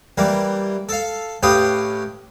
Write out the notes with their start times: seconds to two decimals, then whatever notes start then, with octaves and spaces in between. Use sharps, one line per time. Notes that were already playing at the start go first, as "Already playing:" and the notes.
0.18 E3 G3 A#3
0.89 A4 F5
1.43 A2 C#4 G4 B4 F5 D#6